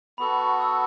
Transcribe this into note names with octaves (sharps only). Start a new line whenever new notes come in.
B3 F#4 A4 B5
C#6
E6